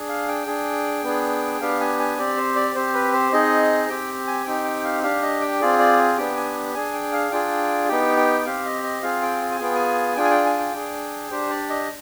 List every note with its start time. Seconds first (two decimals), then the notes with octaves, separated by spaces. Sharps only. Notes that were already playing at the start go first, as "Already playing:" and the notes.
Already playing: D4 G#4
0.09 F5
0.28 G5
0.47 D4 G#4
1.04 B3 D4 G#4
1.61 B3 D4 G4 F5
1.80 G#5
1.99 G#5
2.18 C4 G4 D5
2.37 C5
2.56 D5
2.75 C4 G4 C5
2.94 B4
3.13 C5
3.32 C4 D#4 G#4 D#5
3.89 C4 G4 G5
4.27 G#5
4.46 C4 D#4 G4 G5
4.65 G5
4.84 F5
5.03 D4 G4 F5
5.22 D#5
5.41 G5
5.60 C4 F4 G#4 D5
5.79 D5
6.17 B3 D4 G4 G5
6.36 G#5
6.75 D4 G#4 G#5
6.94 G5
7.12 F5
7.31 D4 F4 G#4 G5
7.88 B3 D#4 G4 G5
8.17 G5
8.45 C4 G4 F5
8.65 D#5
8.83 D#5
9.02 C4 F4 G#4 F5
9.22 G5
9.51 G#5
9.59 B3 F4 G#4 G5
9.75 G#5
10.16 D4 F4 G#4 G5
10.24 G#5
10.31 G5
10.45 G#5
10.59 G5
10.73 D4 G#4
11.31 D4 G4 C5
11.50 D5
11.69 D#5